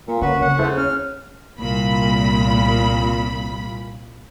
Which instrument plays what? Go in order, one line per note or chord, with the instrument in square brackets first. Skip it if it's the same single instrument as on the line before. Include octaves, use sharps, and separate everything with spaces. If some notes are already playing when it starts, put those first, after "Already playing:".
[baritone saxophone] A#2 [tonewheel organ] A#3
[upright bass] D3 C4 [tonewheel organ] A#3 C#4 [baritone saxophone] F#4 [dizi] B4
[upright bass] C#3 G3 [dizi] F#5
[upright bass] D#2 [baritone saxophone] C#3 [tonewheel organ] E4 A4 C5
[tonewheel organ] C#4 [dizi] F6
[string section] C2 A#2 B5